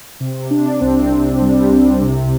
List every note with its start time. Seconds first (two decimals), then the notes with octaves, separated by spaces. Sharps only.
0.20 C3
0.51 C3 D4
0.81 C2 C4
1.12 C3
1.41 G3
1.71 C2
2.02 C3